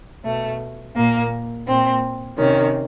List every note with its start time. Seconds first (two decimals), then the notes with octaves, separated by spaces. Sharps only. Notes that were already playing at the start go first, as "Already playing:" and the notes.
0.24 B2 A3
0.95 A#2 A#3
1.66 A#2 C4
2.38 C3 D#3 C#4